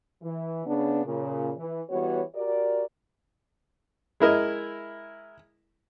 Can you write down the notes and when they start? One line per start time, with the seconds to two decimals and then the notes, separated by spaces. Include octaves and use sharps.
0.23 E3
0.66 C#3 B3 D4
1.05 A#2 C#3
1.57 E3
1.90 E3 G3 B3 F#4 C#5
2.35 F#4 G4 A#4 D5
4.20 G#3 E4 A#4 D#5